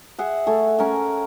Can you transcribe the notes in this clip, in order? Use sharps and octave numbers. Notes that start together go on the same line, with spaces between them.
G#4 E5 F#5
A3 G#5
C#4 A#4 F#5 G#5